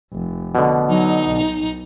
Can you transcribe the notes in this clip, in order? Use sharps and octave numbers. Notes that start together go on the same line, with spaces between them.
F1
B2 D3
F#3 D#4
B1